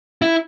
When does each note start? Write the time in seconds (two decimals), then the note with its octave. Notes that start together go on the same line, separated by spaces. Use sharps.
0.22 E4